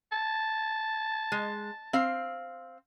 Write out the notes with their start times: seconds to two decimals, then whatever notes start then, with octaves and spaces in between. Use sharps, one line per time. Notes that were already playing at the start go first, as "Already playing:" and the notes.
0.12 A5
1.32 G#3
1.93 C4 F5